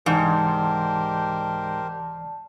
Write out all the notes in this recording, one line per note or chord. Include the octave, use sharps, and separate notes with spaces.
C2 G#2 E3 G4 A#4 C5 D5 A5